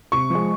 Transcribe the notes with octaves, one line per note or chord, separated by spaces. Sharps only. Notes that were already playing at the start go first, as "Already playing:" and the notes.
C3 C#6
F3 G#3